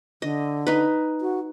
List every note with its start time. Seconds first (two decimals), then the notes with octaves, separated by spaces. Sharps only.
0.22 D3 D#5
0.67 D#4 B4
1.21 F#4